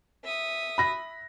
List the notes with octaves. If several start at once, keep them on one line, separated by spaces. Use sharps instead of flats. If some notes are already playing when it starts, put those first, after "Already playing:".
E5 D#6
B5 A#6